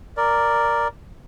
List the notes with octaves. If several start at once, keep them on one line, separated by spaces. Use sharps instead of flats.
A#4 D5